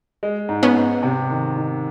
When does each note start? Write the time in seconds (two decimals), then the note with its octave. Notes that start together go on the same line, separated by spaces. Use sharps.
0.23 G#3
0.49 G#2
0.63 B3 C#4
0.76 G#2
1.03 C3
1.30 D#3
1.56 D#3